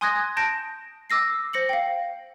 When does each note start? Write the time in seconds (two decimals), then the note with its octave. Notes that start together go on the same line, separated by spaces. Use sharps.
0.01 G#5 C6 D#6 F#6 G#6 A#6
0.37 A5 G6 A#6 D7
1.10 D6 E6 A#6 C7
1.53 C5 A#6 C#7 F#7
1.69 F5 G5